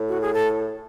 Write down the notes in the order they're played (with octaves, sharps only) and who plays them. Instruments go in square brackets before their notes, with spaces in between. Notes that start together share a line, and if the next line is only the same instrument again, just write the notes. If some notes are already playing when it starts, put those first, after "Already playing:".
Already playing: [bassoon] A2
[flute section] F#4
G#4
A4